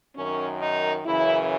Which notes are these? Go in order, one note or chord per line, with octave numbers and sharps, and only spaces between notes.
F#2 D#3 C#4
D#4
F#2 C#3 E3 E4